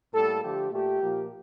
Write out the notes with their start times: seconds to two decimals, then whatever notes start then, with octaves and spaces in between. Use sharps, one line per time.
0.13 A2 G3 A#3 A4
0.42 D3 F3 A3 G4
0.72 A#2 A3 G4
1.02 A#2 F3 A#3